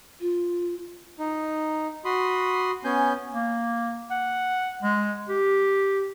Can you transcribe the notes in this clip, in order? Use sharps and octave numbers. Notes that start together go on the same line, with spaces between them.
F4
D#4
F#4 B5 C6 D#6
B3 C#4 G#5 G6
A#3
F#5
G#3
G4